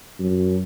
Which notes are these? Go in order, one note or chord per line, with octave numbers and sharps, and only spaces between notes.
F#2